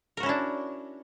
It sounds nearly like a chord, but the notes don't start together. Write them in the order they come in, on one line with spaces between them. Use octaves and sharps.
A#4 F#4 C#4 E4 D4